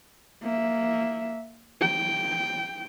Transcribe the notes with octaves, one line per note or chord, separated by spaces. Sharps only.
A#3 E5
G5